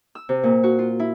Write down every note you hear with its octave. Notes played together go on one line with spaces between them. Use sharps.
E6
C3
A#2
F#4
F4
E4